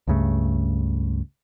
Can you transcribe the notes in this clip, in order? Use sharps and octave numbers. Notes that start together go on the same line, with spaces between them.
C#2 G2 C#3 A3